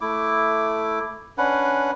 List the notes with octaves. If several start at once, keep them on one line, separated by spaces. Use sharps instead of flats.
A3 E4 D6
C#4 D4 B4 F#5